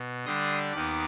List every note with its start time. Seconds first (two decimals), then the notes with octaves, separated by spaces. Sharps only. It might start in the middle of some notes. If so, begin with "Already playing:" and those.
Already playing: B2
0.25 D3 G3 D4 C6 D#6
0.72 D#2 D#3 B3 D#4 B5 D6